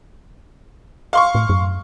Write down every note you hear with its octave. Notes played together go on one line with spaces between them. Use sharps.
F5 C6 C#6
A2
F#2